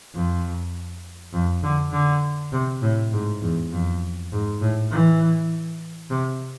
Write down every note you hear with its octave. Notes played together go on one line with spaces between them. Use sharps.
F2
F2
D3
D3
C3
A2
G#2
E2
F2
G#2
A2
E3
C3